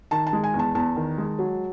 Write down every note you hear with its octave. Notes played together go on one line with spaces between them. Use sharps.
D#3 A5
A5
G#3
G#5
E2
A5
E2 A5
D#3
G#3
F#3